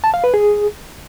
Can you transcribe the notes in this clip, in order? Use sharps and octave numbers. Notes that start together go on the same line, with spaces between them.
A5
F5
B4
G#4